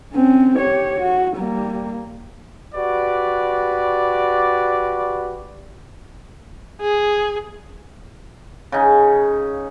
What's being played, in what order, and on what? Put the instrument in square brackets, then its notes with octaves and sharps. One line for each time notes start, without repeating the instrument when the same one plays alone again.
[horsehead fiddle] C4 C#4
G4 C#5
F#4
G3 A#3
[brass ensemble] F#4 G4 B4 D5
[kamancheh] G#4
[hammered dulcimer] C#3 D#4